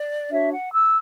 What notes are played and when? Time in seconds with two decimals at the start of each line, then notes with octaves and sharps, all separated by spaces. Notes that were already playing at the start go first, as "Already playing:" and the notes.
Already playing: D5
0.30 D4 F#4 C#5 E5
0.51 F#5
0.73 E6